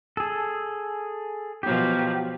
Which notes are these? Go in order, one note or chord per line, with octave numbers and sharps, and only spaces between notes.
G#4 A4
B2 F3 F#3 G4